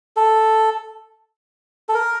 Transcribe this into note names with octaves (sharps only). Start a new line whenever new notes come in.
A4
A4
A#4